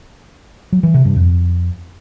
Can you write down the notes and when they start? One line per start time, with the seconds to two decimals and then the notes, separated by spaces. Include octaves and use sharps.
0.72 F#3
0.83 E3
0.94 C3
1.05 G2
1.16 F2